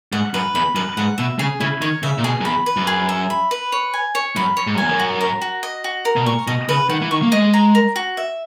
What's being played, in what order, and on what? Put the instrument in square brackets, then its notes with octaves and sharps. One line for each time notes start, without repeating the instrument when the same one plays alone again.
[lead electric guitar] G#2 [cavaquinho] F#5
[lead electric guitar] F#2 [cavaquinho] B4
[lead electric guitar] E2 [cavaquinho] B5
[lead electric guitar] F#2 [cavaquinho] B4
[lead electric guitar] G#2 [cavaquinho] F#5
[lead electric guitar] B2 [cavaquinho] E5
[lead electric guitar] C#3 [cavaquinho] G#4
[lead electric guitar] C#3 [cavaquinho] E4
[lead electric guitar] D#3 [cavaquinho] C#5
[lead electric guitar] C#3 [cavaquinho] E5
[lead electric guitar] A#2
[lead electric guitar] B2 [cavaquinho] G#4
[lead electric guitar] F#2
[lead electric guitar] E2 [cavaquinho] B5
[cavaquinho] B4
[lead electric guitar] F#2
[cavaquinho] G#4
E5
B5
B4
C#5
G#5
C#5
[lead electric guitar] F#2 [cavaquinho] B5
[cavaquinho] C#5
[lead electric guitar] G#2
F#2
[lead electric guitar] E2 [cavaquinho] G#5
[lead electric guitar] F#2
[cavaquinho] F#4
A#4
F#4
D#5
F#4
A#4
[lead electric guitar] B2
[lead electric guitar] A#2 [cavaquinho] C#6
[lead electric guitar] B2 [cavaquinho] D#5
[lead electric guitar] C#3 [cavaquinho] B4
[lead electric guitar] D#3 [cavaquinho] F#5
[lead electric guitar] E3
[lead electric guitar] D#3 [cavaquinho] C#6
[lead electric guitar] A#3
[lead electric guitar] G#3 [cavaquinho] D#5
[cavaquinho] A#5
A#4
F#4
E5